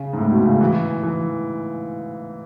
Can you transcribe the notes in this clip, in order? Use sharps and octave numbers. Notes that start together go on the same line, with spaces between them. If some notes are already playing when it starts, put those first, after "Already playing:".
Already playing: C#3
G#2
A2
B2
C#3
E3
E3